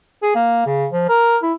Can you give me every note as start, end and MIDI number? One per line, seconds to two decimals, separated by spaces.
0.23 0.32 68
0.35 0.65 58
0.66 0.87 49
0.92 1.04 53
1.09 1.37 70
1.42 1.53 64